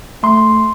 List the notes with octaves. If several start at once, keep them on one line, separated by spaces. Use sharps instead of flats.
A3 C6